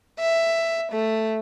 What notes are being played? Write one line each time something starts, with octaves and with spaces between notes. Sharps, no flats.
E5
A3